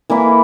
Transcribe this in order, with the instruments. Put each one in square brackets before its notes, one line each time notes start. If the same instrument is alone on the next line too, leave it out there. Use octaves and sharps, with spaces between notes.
[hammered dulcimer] E3 A#3 E4